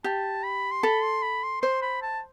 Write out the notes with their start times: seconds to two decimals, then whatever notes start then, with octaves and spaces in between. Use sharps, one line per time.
0.04 G4 A5
0.44 B5
0.71 C6
0.83 A4 B5
1.03 C6
1.22 B5
1.43 C6
1.62 C5 C6
1.82 B5
2.02 A5